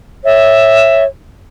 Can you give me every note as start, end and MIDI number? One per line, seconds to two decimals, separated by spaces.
0.25 1.07 73
0.25 1.03 76